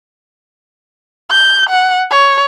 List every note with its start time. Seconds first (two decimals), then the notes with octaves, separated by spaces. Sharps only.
1.31 G6
1.70 F#5
2.11 C#5